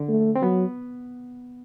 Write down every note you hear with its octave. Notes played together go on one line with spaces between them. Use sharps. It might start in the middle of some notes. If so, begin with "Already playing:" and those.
Already playing: D3
A3
C4
F#3 B3